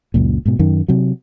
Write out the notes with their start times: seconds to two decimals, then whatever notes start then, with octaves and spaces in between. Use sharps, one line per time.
0.14 C#2 F#2 A#2
0.46 G#2 B2
0.59 F#2 D#3
0.88 C3 F#3